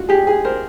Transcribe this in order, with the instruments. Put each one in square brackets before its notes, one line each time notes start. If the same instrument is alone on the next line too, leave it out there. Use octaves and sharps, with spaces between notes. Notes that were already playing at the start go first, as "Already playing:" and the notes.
Already playing: [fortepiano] F4 F#4
[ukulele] G4 [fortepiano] G#4
[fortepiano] G#4
[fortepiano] A#4 [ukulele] C5